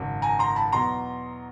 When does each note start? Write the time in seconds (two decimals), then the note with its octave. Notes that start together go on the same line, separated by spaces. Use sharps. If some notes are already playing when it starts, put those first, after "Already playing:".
Already playing: G#1 F#2 C#3
0.22 G#5 A#5
0.39 A#5 C6
0.56 A5 B5
0.72 E2 B2 F#3 A#5 C6